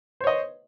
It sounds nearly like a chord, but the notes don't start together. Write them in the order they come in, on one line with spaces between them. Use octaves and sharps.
C5 C#5 D#5